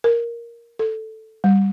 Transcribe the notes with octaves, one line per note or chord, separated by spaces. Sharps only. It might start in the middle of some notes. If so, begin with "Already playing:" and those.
A#4
A4
G3